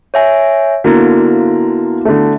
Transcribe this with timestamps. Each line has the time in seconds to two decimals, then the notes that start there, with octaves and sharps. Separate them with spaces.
0.14 C#5 E5 G#5
0.84 D3 A#3 B3 E4 F#4
2.05 D3 A3